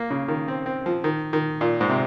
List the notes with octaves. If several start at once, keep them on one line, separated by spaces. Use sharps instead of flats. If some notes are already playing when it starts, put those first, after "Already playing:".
Already playing: A#3
C#3
D#3
C4
C4
F3
D#3
D#3
A#2
G#2
C3